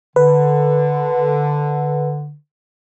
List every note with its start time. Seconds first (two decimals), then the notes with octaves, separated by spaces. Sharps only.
0.16 D3 B4